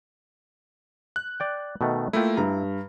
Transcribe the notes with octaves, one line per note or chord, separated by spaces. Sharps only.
F#6
D5 G5
B2 D#3 A3
A3 A#3 E4 F4 G5
G2 A#5